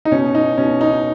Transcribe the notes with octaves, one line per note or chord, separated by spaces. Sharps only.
D#4
B2 C#4
D#4
B2 C#4
D#4